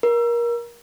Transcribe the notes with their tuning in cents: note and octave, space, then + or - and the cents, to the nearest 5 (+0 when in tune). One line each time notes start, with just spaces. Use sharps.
A#4 +25